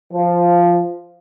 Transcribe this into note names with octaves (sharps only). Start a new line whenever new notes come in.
F3